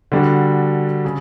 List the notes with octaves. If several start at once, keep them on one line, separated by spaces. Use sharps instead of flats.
D3 G3 D4 F#4
C#3